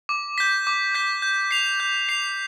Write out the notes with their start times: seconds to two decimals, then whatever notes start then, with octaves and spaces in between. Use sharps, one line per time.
0.09 D6
0.38 G6 B6
0.67 D6
0.95 G6 B6
1.22 G6
1.51 C7 F7
1.80 G6
2.09 C7 F7